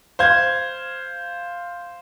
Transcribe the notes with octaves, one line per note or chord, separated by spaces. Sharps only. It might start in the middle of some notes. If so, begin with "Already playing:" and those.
C5 F5 G#6